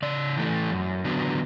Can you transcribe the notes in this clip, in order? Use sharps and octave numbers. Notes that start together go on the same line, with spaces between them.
C#3 D5
E3 A3
F#2
D3 F#3 B3